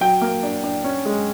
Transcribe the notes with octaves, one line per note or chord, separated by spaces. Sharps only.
F#3 G5
A#3
D4
D4
C#4
G#3